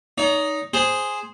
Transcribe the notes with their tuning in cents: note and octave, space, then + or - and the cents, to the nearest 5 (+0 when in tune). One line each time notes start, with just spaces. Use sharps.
D#4 +0 C#5 +40
G#4 +0 C5 +0